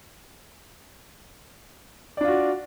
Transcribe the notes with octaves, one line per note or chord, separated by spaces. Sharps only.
D4 F4 F#4 D5